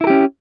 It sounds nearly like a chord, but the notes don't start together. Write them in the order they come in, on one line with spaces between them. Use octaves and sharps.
E4 A#4 G4 C#4